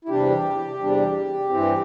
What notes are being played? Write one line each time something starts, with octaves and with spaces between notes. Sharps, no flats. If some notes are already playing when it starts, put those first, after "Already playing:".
E4
E2 C3 G3 D4 G4
E2 C3 G3 D4
G2 E3 C4